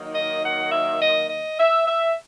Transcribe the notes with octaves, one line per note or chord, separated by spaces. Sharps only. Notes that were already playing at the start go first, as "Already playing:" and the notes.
Already playing: D#3 F#3 A#3 D#4
D#5
F#5
E5
D#5
D#5
E5
E5